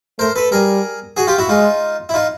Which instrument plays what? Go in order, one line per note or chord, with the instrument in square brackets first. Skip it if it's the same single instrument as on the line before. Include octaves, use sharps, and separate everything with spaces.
[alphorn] A3 [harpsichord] A#4 C5
[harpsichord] A4 B4
[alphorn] G3 [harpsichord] G#4 A#4
[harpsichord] F#4 G#4
F4 G4
E4 F#4
[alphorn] G#3 [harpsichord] D#4 F4
[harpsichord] E4
D#4 F4